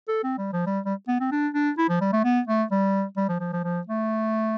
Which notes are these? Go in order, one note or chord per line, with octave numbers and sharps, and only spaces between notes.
A4
C4
G3
F3
G3
G3
B3
C4
D4
D4
E4
F3
G3
A3
B3
A3
G3
G3
F3
F3
F3
F3
A3